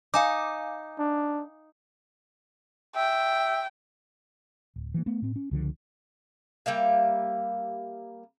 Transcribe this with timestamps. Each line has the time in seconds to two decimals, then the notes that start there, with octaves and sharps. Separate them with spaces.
0.14 D#4 F5 G#5 D6
0.99 D4
2.96 E5 G5
4.76 D1
4.94 E3 F#3 A#3
5.06 A3 B3
5.22 A2 C4
5.36 C#4
5.51 C#2 D3 F3
6.66 G3 A#3 E5 F5